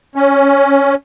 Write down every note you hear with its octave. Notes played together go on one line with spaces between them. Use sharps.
C#4